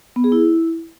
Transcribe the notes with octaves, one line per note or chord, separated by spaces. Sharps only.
B3
G#4
E4